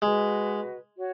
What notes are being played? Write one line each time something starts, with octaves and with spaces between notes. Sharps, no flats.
G#3 F#4 B4 D#5
F#4 C#5